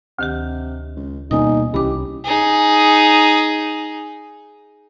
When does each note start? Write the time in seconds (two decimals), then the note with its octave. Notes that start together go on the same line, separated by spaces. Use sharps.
0.19 D2 C3 D#3 G4
0.96 C#2
1.31 D#1 B2 D#4 G#5 D#6
1.74 C2 E3 C#4 G4 B5 D6
2.24 D#4 G#4